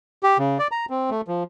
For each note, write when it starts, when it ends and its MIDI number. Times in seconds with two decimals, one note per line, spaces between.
0.23 0.38 67
0.38 0.58 49
0.59 0.68 74
0.71 0.86 82
0.90 1.10 60
1.10 1.21 57
1.28 1.43 53